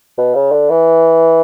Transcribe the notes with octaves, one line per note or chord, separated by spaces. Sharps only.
B2
C#3
D3
E3